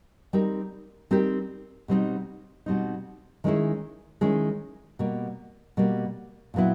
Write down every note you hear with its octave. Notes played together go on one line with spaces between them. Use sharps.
G3 C4 D#4 G4 A#4
G3 C4 D#4 G4 A#4
B2 G3 C4 D#4
B2 G3 C4 D#4
D#3 G#3 C#4 E4 G#4
D#3 G#3 C#4 E4 G#4
B2 G3 A#3
B2 G3 A#3
A#2 F#3 B3 E4